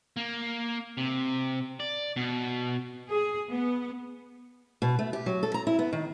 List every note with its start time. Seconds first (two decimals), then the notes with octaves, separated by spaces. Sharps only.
0.17 A#3
0.98 C3
1.80 D5
2.17 B2
3.09 G#4
3.51 B3
4.82 B2
4.99 A3
5.13 G4
5.26 F#3
5.43 A4
5.54 A#5
5.67 E4
5.79 B3
5.93 D#3